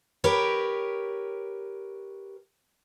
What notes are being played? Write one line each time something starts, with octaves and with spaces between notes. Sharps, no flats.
G4 A#4 B4 C#5